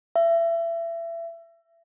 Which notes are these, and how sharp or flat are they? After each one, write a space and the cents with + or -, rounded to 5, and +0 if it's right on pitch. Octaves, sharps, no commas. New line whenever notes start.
E5 +30